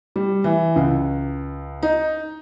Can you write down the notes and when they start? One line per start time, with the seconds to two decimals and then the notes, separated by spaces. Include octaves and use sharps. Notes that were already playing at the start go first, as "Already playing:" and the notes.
0.16 G3
0.44 E3
0.76 C#2
1.83 D#4